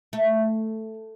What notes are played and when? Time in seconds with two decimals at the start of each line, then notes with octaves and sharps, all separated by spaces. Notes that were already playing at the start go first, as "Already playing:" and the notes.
0.13 A3